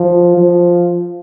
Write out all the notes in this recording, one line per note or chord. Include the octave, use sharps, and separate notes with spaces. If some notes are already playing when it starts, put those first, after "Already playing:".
Already playing: F3
F3